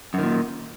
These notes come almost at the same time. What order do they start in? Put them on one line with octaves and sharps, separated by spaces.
F#2 D#3 A#2